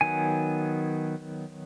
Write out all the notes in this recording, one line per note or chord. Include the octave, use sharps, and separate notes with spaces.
D#3 F#3 B3 G#5